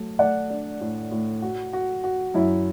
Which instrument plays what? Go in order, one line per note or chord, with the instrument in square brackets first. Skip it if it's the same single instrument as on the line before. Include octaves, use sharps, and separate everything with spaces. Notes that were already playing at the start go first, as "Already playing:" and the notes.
Already playing: [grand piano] F#3 A3
[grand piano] A3 [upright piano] D5 F#5
[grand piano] D4
A2
A2
F#4
F#4
F#4
[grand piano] F#2 [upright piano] E4